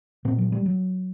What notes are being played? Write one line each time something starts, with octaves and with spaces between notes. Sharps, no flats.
A#2 C4
F#3
G3
F#3